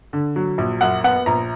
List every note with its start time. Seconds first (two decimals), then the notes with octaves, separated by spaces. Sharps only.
0.13 D3
0.36 F#3
0.58 A#1
0.81 F#2 F#5
1.04 B3 F#5
1.26 A#1 A#5